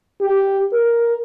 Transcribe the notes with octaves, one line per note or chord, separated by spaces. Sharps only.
G4
A#4